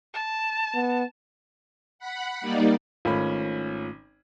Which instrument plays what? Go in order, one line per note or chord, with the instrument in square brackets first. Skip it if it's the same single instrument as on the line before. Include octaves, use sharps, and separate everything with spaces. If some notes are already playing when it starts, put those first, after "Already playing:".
[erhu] A5
[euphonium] B3
[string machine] F#5 B5
G3 A#3 D#4 D5
[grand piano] G#1 C#4 B5 [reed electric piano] G#2 A3 F4